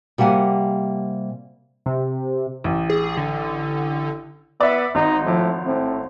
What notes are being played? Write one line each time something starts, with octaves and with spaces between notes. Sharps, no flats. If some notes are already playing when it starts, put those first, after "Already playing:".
C3 G3 A#3 F#5 G#5
C3
A1
G#4
D3
B3 D5 E5
G#1 D#4
A2 F3
A2 C4